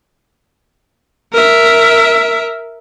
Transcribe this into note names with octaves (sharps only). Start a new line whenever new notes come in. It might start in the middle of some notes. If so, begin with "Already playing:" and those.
A#4 E5